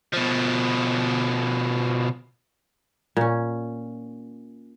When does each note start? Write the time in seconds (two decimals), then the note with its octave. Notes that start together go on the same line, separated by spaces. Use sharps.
0.13 B2 F3
3.17 A#2 C#4